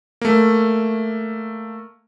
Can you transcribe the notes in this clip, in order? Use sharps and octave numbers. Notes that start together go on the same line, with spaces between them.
A3 A#3